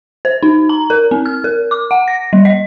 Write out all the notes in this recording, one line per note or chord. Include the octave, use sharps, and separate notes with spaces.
C5
D#4
A#5
A#4
C4
F6
A#4
D6
F#5
A#6
G3
D#5